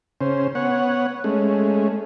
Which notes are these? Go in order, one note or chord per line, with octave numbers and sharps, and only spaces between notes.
C#3 C#4 C5
B3 C#5 F#5
G#3 A3 C#4